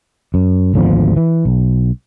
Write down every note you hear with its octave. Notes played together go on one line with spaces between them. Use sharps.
F#2
G#1 D2 F3 B3
E3
B1